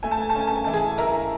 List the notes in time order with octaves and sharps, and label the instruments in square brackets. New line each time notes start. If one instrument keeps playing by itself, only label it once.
[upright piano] A3 G#5
A5
G#5
A5
C#4 G#5
A5
G#5
E3 A5
G#4 G#5
E4 A#4 A#5